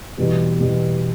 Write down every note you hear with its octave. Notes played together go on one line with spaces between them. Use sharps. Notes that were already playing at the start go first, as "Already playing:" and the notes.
E2 B2 G3
E2 B2 G3